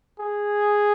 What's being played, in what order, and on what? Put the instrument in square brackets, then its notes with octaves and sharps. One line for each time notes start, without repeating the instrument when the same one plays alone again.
[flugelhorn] G#4